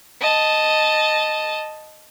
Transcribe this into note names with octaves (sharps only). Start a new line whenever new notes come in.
D#5 A5